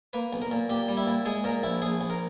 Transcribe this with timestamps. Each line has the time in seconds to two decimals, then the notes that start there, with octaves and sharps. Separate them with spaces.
0.13 A#3 B4
0.33 B1
0.42 A#4
0.51 A#2
0.69 A#2 G4
0.88 G3
0.97 E4
1.07 A#2
1.25 G#3 G#4
1.44 A#2 A#4
1.63 A#1 E4
1.82 A#1 G#4
2.01 A#1
2.10 A#4